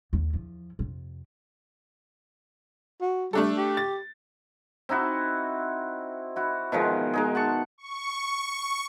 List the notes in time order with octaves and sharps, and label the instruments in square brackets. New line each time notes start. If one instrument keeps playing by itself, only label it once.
[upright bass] D#2
E2 F3
F2 C3
[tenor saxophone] F#4
[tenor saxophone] G3 [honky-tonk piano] A3 D4 A4
[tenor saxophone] G4
[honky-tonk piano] A6
[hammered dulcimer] C4 D#4 E4 F#4
E4 F#4
B2 D#3 F3 G#3
G#3 D#4 G#4
F#5 A5 C#6
[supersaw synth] C#6